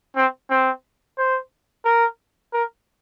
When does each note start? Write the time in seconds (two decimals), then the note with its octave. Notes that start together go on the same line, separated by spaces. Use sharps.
0.16 C4
0.50 C4
1.18 C5
1.85 A#4
2.53 A#4